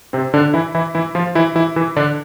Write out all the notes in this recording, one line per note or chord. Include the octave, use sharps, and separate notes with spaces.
C3 C4
D3 D4
E3 E4
E3 E4
E3 E4
F3 F4
E3 E4
E3 E4
E3 E4
D3 D4